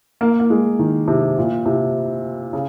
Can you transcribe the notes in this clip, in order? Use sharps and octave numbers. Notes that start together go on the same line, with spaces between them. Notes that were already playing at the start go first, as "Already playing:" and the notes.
A#3
A#3
G#3
D#3
C3
A#2
C3
C#3